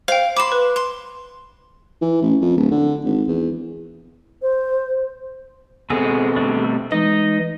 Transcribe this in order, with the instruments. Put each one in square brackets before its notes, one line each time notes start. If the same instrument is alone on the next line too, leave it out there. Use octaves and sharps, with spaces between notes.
[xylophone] C5 G5 [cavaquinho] F5
[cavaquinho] B5 C6 [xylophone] D6 E7
[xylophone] B4
[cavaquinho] C6
[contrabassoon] E3
A1
F2
D1
D3
G#1
E2
[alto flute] C5
[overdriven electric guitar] B2 C4 [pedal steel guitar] G#3 F#4 G#4 [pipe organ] A4
[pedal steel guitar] G3 A3 D4
[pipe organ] E3 G#3 [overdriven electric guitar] D#4 [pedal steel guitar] D#5